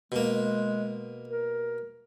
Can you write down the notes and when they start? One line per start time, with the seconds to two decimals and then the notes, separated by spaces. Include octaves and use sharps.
0.12 B2 G#3 A#3
1.29 A#4